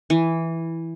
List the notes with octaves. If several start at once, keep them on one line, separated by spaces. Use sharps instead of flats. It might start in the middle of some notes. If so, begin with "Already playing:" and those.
E3